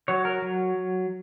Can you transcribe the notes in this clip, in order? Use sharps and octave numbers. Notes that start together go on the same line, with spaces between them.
F#3 C#5
A#4
F#3